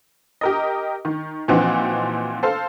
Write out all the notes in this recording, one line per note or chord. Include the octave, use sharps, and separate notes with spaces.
G4 A#4 D#5
D#3
A#2 E3 F3 C4 D#4 F#4
A4 C5 F5